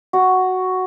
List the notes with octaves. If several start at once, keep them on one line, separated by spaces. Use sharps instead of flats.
F#4